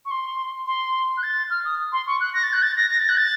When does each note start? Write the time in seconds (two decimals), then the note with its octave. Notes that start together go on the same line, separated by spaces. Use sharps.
0.05 C#6
0.11 C6
0.66 C6
1.17 F#6
1.23 A6
1.50 F6
1.65 D#6
1.92 C6
2.07 C#6
2.20 F#6
2.34 A#6
2.43 A6
2.53 F#6
2.63 A6
2.76 A#6
2.91 A#6
2.99 A6
3.09 F#6
3.17 A6